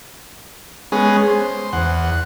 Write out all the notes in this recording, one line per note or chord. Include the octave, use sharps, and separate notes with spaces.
G#3 B3 C#4 G#4
C5
E2 F#5